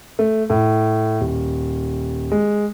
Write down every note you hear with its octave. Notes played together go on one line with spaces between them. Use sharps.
A3
A2
D#1
G#3